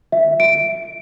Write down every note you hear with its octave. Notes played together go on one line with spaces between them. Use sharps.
E5
D7